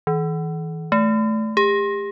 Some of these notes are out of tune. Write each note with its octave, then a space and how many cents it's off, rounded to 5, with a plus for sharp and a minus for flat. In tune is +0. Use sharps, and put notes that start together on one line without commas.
E3 -40
A3 -15
G4 +40